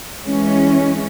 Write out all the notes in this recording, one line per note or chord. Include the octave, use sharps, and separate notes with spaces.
E3 G#3 C#4